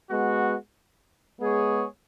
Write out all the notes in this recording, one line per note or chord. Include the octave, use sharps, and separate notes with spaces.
G#3 B3 F#4
G#3 B3 G#4 C#5